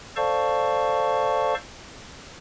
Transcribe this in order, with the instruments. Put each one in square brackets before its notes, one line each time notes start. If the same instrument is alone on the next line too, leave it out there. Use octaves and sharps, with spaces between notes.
[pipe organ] A4 C5 D5 F5 A5 C#6